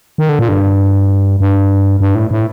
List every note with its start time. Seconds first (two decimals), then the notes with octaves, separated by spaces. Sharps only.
0.18 D#3
0.29 D3
0.39 A#2
0.48 G2
1.40 G2
2.00 G2
2.15 A2
2.31 A2